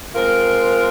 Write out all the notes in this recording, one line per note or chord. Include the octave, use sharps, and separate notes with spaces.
G#3 C4 F4 A#4